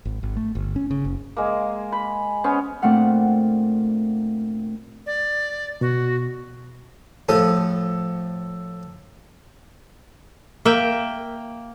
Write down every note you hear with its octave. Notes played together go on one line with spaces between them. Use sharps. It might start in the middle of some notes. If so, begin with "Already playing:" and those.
G#1
G#1
A3
G1
C#4
C#3
F#1
G#3 A#3
B5
B3 C#4 C5
A#2 A3 C4 D4 F#5 F6
D5
B2 F#4
A2 F3 A4 D#6
A#3 E5 G5